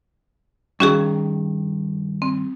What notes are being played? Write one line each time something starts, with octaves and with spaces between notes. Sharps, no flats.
G2 D#3 C#4 F#4 G#4
C4